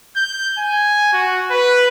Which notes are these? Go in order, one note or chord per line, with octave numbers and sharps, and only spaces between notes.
G6
G#5
F#4
B4